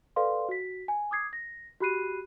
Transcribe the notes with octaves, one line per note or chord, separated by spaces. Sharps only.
A4 B4 D5 F5 C6
F#4 B6
G#5
D6 D#6 G#6 C7
A#6
F#4 G4 B5 F#6 C7 D#7